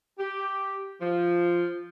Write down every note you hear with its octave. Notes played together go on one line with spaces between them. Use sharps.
G4
F3